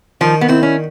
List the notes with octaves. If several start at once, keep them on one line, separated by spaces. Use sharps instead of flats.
D#3 F3
B3
C4 E4
C#4